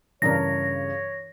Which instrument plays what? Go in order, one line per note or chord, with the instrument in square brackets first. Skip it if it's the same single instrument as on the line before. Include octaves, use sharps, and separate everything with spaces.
[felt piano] G2 C#3 [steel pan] E3 D4 A#4 [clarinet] C#5 [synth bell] A#6